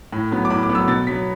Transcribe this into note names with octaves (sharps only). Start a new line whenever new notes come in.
A2
F#3 B3
D6
A2 B5
D6
F#3 B3
E6
B2 A6
F#3 B3 B6